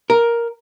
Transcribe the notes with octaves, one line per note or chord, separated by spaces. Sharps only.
A#4